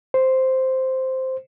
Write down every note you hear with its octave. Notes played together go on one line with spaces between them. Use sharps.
C5